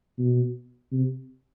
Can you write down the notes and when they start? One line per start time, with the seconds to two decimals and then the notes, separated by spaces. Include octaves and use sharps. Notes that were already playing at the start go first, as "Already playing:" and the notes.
0.18 B2
0.92 C3